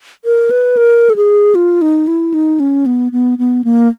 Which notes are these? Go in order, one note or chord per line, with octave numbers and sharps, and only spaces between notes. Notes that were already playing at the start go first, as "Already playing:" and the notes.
A#4
B4
A#4
A4
G#4
F4
D#4
E4
D#4
C#4
B3
B3
B3
A#3